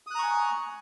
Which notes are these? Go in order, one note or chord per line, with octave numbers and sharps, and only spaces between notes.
G#5 A#5 C#6 D#6 F#6